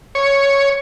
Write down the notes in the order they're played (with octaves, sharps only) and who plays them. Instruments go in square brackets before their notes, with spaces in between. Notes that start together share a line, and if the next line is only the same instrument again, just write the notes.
[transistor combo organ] C#5